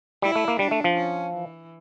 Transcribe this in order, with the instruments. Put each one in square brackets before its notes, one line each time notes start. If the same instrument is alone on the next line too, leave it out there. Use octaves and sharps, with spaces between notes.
[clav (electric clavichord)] G3 [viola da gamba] E4
[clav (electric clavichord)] A3
A#3
[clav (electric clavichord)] G3 [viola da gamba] D4
[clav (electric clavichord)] A3
F3
[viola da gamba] C#4
E3